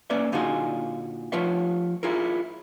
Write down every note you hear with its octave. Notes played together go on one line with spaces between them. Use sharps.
A#3 C#4 B4 D5 E5
A#2 D3 D#4 F4 F#4 G#4
F3 A3 F4 B4 C#5 E5
E4 F4 G#4 A#4